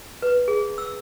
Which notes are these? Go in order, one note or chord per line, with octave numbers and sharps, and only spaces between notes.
B4
G#4
E6